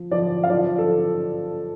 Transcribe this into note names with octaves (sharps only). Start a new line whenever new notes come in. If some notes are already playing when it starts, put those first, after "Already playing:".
Already playing: F3
F3 D5
F5
F3 D5
A4